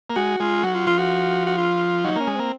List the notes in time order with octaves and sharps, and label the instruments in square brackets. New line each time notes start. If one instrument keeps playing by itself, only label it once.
[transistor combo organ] A#3
[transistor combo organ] G#3 [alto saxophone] F#4
[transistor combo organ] G#3 [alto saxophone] F4
[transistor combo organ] F#3 [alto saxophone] F#4
[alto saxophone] F4
[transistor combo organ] F3 [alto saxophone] F4
[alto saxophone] F#4
F#4
F4
[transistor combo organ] F#3 [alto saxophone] D#4
[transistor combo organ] A#3 [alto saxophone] C#4
[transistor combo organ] G#3
[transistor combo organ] A#3 [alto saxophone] C4